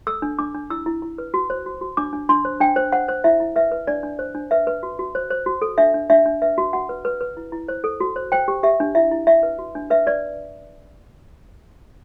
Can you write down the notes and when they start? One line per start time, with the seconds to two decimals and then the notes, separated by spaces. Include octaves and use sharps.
0.07 A4 E6
0.22 D4
0.39 D4 D6
0.55 D4
0.70 E4 E6
0.86 E4
1.02 E4
1.18 B4
1.34 F#4
1.50 C5
1.66 F#4
1.81 F#4
1.97 D4 D6
2.13 D4
2.29 D4 C6
2.45 C5
2.61 D4 G5
2.76 C5
2.92 C5 F#5
3.08 C5
3.24 E4 E5
3.40 E4
3.56 B4 E5
3.71 B4
3.87 D4 D5
4.03 D4
4.19 C5
4.35 D4
4.51 B4 E5
4.67 B4
4.83 F#4
4.99 F#4
5.15 C5
5.30 C5
5.46 F#4
5.62 A4
5.78 D4 E5
5.94 D4
6.10 D4 E5
6.26 D4
6.42 B4 E5
6.58 F#4
6.73 F#4 F#5
6.89 B4
7.05 B4
7.21 B4
7.37 E4
7.52 E4
7.68 C5
7.84 A4
8.00 F#4
8.16 C5
8.32 C5 G5
8.48 G4
8.63 G4 E5
8.80 D4
8.95 E4 E5
9.11 E4
9.27 E4 E5
9.43 B4
9.59 F#4
9.75 D4
9.90 B4 E5
10.06 B4 D5